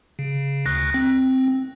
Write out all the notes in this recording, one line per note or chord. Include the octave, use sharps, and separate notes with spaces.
C#3
D2 F#6 A#6
C4